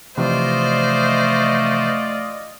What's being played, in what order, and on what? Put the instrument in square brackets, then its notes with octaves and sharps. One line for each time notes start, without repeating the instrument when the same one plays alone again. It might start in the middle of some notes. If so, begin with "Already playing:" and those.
[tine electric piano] C3 E3 F3 [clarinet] A3 [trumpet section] F4 D5 D#5 [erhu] C5